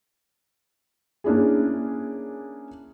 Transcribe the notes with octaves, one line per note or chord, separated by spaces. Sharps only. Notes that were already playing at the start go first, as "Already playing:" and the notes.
A#3 C#4 D4 E4 G#4